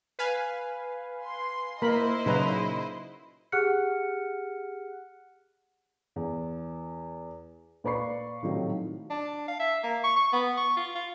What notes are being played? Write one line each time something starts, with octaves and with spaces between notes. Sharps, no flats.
B4 F5 G#5
C6
A#3 E4 A#4 C5 D#5 B5
A#2 C#3 F#3 D#4 B4 A#5
G4 G#4 F#5 F6 F#6 C#7
E2
A#2 B4 D5 B5 C#6 C7
A2 C3 D#3 F3 F#3 A3
D4
F5
E5
A#3
C#6
C#6
B3
C#6
F4
F4